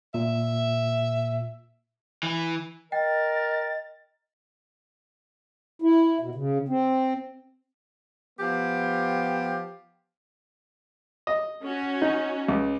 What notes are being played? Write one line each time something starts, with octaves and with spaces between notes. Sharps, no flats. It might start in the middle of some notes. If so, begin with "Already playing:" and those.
A#2 E5
E3
A#4 D#5 G5 A6
E4
B2
C#3
C4
F3 B3 G4
D#5
C#4 F#4
D#4
C#2